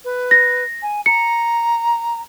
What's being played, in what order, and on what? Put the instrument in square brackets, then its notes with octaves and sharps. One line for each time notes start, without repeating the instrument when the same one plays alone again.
[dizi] B4
[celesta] A#6
[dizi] G#5
[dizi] A#5 [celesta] C#7